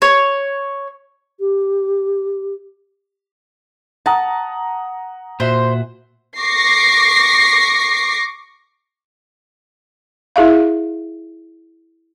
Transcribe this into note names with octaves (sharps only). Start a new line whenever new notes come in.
C#5
G4
F#5 A5 A#5 D#6
A#2 F#4 C5 E5
C#6 D6 A#6 C7
E4 G#4 E5 F5